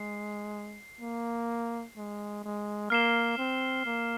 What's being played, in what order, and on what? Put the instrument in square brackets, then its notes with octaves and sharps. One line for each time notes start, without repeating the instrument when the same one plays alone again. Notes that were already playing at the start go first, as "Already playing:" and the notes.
Already playing: [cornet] G#3 [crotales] C7
[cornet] A#3
G#3
G#3
[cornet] A#3 [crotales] F6 C7 E7 G7
[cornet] C4
A#3